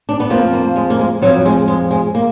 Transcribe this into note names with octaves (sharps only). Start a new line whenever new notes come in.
D4
B3
F2 F3 A#3
A#3
G#3
A#3
G#3
F2 F3 F#3
G#3
G#3
G#3
A#3